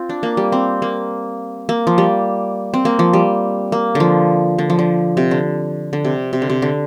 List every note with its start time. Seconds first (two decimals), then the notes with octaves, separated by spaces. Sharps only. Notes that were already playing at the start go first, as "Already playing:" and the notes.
Already playing: C4 F4
0.09 D4
0.23 A#3
0.37 G3
0.52 C4
0.82 A#3
1.69 A#3
1.87 F3
1.98 G3
2.74 C4
2.85 A#3
2.99 F3
3.13 G3
3.72 A#3
3.95 D3 F3
4.58 D3
4.70 F3
4.79 D3
5.17 C3
5.31 D3
5.93 D3
6.05 C3
6.33 C3
6.42 D3
6.50 C3
6.62 D3